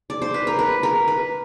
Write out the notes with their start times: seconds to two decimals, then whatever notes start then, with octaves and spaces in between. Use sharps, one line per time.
0.10 D5
0.22 C5
0.34 B4
0.47 A#4
0.59 B4
0.83 A#4
1.08 B4